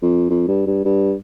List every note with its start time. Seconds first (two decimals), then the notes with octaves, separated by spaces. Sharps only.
0.02 F2
0.30 F2
0.48 G2
0.67 G2
0.85 G2